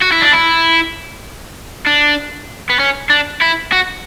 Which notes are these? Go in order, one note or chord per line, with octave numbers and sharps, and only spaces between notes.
F#4
E4
D4
E4
D4
B3
C#4
D4
E4
F#4